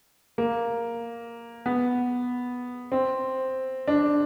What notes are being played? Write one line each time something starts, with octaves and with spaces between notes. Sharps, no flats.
A#3
B3
C4
D4